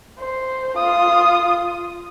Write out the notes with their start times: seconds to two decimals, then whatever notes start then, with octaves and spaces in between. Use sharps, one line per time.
0.19 C5
0.77 F4 D#6